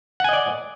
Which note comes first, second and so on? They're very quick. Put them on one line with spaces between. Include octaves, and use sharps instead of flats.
F#5 G#5 D#5 D5